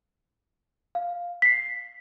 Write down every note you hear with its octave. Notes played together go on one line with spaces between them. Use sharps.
F5
B6 C7